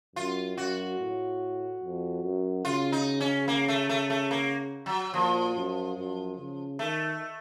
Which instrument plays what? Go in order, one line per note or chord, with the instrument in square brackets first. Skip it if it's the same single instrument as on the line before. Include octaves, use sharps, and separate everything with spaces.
[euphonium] F#2 [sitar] F4
[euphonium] F#2 [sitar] F#4
[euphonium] A2
F2
F#2
[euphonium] C#3 [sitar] F4
[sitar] D#4
C#4
A#3
A3
A3
A3
A#3
F#3
[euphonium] A#2 [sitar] F3
[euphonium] F#2
F#2
C#3
[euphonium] D#3 [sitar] A3